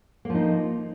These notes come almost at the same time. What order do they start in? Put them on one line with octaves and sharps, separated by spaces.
A#3 F3 D#4